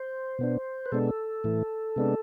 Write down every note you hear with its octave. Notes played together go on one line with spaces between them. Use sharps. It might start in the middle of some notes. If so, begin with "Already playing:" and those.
Already playing: C5
B2 B3 D4
B4
B2 G#3 B3 D4 A4
A2 E3 A3
C3 G#3 B3 D4